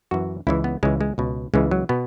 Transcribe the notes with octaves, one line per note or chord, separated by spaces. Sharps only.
F#2 E3 F#4
C#2 C#3 E3 E4
B3
C#2 C#3 E3 G#3
G#3
C#2 B2
C#2 C#3 E3 G#3
F#3
B2 B3